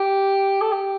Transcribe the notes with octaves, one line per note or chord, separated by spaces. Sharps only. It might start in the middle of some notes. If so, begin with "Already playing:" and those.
Already playing: G4
A4
G4